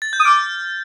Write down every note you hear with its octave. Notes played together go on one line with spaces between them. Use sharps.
A6
G6
D#6
D6 F6